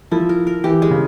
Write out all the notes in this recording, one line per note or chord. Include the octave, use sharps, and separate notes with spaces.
F3 E4
A#4
A#4
E3 G4
G#3
C#3